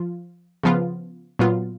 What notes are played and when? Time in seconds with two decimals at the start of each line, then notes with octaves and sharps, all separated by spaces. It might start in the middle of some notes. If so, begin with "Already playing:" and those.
Already playing: F3 F4
0.63 C#3 F3 B3 F4
1.39 A#2 F#3 B3 F4